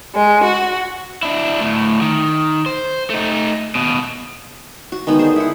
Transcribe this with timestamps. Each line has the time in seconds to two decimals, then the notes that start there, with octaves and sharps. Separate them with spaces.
0.14 G#3
0.44 F#4
1.23 D4 E4
1.61 D2 A2
2.01 D#3
2.66 C5
3.10 A3 D#4
3.75 D#2 B2
4.92 F#4
5.07 D#3 G#3 B3 D#4
5.19 D3 G#4 C5
5.36 E4 F#5